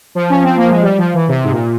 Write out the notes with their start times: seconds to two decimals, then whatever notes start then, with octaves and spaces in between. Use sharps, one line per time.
0.15 F3
0.30 C#4
0.44 C4
0.57 A#3
0.69 G#3
0.83 G3
0.98 F3
1.14 E3
1.28 C3
1.44 G#2
1.51 A#2